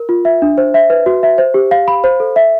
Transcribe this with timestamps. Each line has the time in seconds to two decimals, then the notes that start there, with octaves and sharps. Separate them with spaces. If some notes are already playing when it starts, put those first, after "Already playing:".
Already playing: A#4
0.09 F4
0.25 E5
0.42 D4
0.58 C5
0.74 E5
0.90 B4
1.06 F#4
1.23 E5
1.38 C5
1.54 G4
1.71 F5
1.88 B5
2.04 C5
2.20 A4
2.36 E5